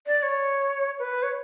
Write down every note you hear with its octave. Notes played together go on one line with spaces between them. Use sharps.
D5
C#5
B4
C#5